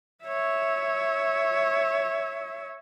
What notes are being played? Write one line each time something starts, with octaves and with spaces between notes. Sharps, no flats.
C#5 E5